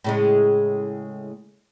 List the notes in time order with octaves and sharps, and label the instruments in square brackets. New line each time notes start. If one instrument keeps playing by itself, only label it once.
[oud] A2 C#3 G#3